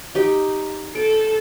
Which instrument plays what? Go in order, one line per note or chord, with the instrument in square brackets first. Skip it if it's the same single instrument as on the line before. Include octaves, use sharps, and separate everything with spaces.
[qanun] D#4 G4
[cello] A4 [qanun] G5